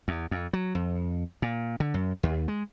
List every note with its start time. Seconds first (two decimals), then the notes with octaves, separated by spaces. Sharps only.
0.08 E2
0.31 F2
0.53 F#3
0.75 F2
1.42 A#2
1.80 D3
1.94 F#2
2.23 D#2
2.48 G#3